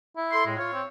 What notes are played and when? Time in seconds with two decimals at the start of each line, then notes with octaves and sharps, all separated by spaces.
0.17 E4
0.32 A4 C6
0.45 A2 G#3
0.57 F4 C#5
0.73 C4